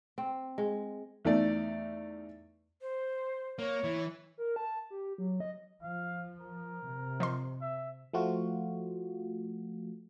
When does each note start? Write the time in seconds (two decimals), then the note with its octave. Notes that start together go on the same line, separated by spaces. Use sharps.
0.18 C4
0.58 G#3
1.25 E2 A3 D#4 D5
2.82 C5
3.59 A#3 C#5
3.84 E3
4.38 A#4
4.56 A5
4.91 G4
5.18 F#3
5.40 D#5
5.82 F3 F5
6.41 A#4
6.87 C3
7.20 F3 D#5 C6
7.61 E5
8.13 F3 A3 F4 F#4